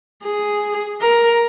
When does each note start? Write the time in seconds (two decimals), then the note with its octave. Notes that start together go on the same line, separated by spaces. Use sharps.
0.24 G#4
1.02 A#4